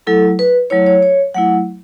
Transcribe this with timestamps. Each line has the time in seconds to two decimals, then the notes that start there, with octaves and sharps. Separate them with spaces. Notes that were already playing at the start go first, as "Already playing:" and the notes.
0.07 F#3 A3 E4 A4
0.39 B4
0.70 F#3 A3 E4 C#5
0.86 C#5
1.03 C#5
1.34 F#3 A3 E4 F#5